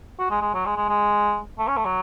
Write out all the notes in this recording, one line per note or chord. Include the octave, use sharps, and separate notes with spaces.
F#4
G#3
G#3
F#3
G#3
G#3
G#3
A3
C#4
A3
F#3